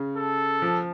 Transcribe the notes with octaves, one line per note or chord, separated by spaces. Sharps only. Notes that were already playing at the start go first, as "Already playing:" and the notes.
Already playing: C#3
A4
F3